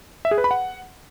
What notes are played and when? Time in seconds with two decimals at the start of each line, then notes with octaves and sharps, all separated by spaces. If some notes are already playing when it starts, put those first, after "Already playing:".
0.25 E5
0.31 G#4
0.38 B4
0.44 B5
0.51 F#5